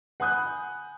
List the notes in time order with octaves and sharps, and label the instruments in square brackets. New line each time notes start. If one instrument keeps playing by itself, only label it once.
[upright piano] F#5 G#5 B5 D#6 F#6 G6